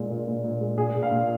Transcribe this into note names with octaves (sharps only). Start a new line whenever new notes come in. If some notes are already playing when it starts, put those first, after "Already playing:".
Already playing: A#2 G#3
A#2
A#2
A#2
G#3
A#2 G#4
A#2
F5
A#2